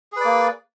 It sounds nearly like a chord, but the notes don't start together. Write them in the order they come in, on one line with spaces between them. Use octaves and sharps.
G#4 B4 D5 A#3